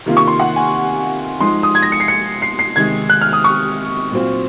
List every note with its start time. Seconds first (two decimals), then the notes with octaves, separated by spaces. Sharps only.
0.06 C3 D#3 A#3 F4
0.17 C#6
0.28 C6
0.39 F#5
0.56 G#5
1.40 F3 G#3 D#4 C6
1.63 D#6
1.75 G#6
1.82 A#6
1.92 C#7
2.00 C7
2.08 C#7
2.42 C7
2.59 C7
2.76 C3 D#3 G#3 D#4 G#6
3.10 F#6
3.21 F6
3.33 D#6
3.44 C#6
4.12 A#2 F#3 C4 F4